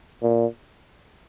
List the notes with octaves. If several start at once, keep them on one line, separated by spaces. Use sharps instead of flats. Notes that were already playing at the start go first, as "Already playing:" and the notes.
A#2